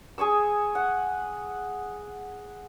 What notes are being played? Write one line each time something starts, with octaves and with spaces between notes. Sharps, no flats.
G#4 G#5 C#6 E6
F#5